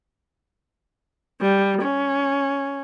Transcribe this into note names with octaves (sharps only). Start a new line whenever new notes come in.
G3
C#4